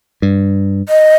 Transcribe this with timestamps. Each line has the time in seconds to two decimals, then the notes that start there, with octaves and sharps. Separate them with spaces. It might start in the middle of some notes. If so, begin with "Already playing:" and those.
0.22 G2
0.89 D#5